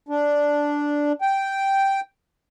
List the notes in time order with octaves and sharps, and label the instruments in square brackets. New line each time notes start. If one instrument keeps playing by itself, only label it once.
[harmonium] D4
G5